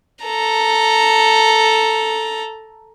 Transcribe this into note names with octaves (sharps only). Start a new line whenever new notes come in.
A4 A#5